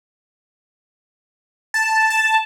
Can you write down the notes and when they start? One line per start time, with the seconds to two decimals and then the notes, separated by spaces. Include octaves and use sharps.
1.74 A5
2.10 A5